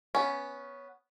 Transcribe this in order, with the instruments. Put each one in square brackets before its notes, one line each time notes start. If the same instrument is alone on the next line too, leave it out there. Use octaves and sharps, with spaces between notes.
[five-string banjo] B3 C#4